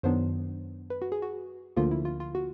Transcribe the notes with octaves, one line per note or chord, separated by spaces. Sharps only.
F#2 D#3 F#3 B3 D4 C5
B4
F#4
G#4
F#4
D2 D3 F3 A#3 F4
E4
F4
F4
F#4